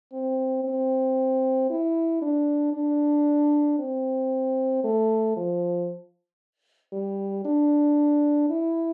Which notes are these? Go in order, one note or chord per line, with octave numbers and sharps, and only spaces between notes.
C4
C4
E4
D4
D4
C4
A3
F3
G3
D4
E4